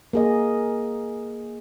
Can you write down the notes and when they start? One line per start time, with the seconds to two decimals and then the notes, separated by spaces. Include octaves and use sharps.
0.13 A#3 G#4 D#5